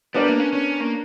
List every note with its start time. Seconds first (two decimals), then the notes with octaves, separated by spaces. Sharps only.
0.14 G3 B3 D4 A#4 D5
0.28 A#3
0.40 C#4
0.53 C#4
0.80 A#3